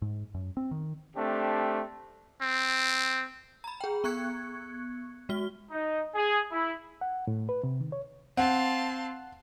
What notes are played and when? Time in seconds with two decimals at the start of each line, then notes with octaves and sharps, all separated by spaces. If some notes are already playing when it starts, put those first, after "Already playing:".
0.02 G#2
0.34 F#2
0.57 C4
0.71 D#3
1.16 A3 C4 D4 G4
2.42 C4
3.64 A#5 B5
3.81 G#4 G5
4.04 B3 C#6 F#6 G#6 C#7
5.29 G#3 F#4 G7
5.72 D#4
6.15 G#4
6.52 E4
7.01 F#5
7.27 A2
7.49 B4
7.63 C3
7.80 D#3
7.92 C#5
8.37 C4 F5 F#5 A5 C6